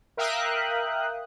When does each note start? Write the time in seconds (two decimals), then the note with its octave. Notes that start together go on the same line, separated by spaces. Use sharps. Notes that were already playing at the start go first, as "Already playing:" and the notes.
0.17 A#4 E5 F5 G5 D#6 F#6